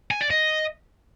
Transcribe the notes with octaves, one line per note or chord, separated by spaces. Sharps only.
G#5
D5
D#5